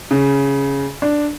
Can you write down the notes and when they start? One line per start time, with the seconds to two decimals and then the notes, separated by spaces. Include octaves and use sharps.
0.11 C#3
1.02 D4